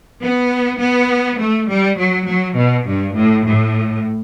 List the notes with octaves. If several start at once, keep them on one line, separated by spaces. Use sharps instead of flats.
B3
B3
A3
G3
F#3
F#3
B2
G2
A2
A2